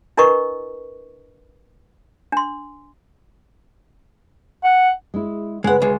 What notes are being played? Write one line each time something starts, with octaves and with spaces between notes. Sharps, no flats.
D4 E4 A#4 B4 D#5 C#6
D4 C6
F#5
G#3 E4
C#3 G#3 G#4 B4 F#5
D2 G#3